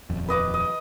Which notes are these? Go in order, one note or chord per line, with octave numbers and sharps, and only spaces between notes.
D#1 F2
B4 D#5 D6
D#5